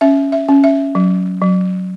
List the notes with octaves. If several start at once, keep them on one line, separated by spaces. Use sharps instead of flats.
C#4 E5
E5
C#4
E5
F#3
F#3